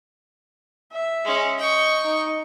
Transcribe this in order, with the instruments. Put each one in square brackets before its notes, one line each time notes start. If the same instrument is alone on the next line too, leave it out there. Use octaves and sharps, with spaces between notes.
[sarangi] E5
[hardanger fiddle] G#3 C#4
[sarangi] D#5 [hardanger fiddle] G5 C#6
[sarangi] D#4